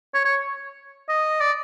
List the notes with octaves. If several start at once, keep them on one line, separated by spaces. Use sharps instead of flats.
C#5
C#5
D#5
D5